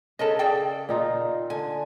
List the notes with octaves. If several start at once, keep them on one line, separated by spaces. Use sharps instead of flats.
C#3 A4 A#4 D#5
G#4 D5 G5
A#2 D#4 F4
D3 G#5